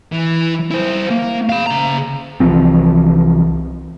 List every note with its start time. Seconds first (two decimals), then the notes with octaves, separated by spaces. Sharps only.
0.12 E3
0.71 E4 C5
1.11 A#3
1.49 F5 B5
1.66 C#3 A#5
2.40 C2 E3 F3 C4